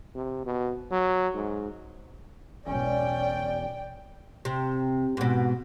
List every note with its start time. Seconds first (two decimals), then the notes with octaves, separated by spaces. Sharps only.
0.15 C3
0.45 B2
0.91 F#3
1.34 G#2
2.67 E1 B1 C#4 D5 G5
4.45 C3
5.17 G#2 B2